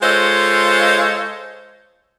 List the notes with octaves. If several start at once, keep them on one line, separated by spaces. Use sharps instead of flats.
G#3 F4 A4 C5 C#5 D#5